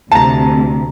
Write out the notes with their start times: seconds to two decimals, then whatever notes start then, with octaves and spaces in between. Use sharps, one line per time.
0.12 D2 C3 A5 A#5